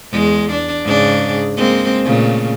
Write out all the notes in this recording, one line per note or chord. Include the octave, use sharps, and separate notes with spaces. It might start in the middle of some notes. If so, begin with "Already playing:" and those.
E2 G#3
D4
G#2 C#3 D4
G#3 A#3 C4
A#2 C#3 A3